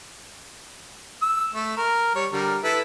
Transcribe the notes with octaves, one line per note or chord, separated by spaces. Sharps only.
E6
A3
A#4
G3 C#5
D3 G3 A#4
E4 A4 B4